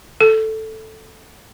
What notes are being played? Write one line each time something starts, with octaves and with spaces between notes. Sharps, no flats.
A4